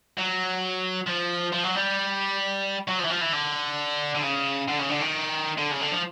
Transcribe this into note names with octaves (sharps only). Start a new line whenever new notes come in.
F#3
F3
F3
F#3
G3
F#3
F3
E3
F3
E3
D3
D3
C#3
D3
C#3
D3
D#3
D3
C#3
D3
F3